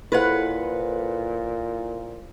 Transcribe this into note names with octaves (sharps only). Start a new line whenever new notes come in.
A#2 E4 A4 B4 C5 F#5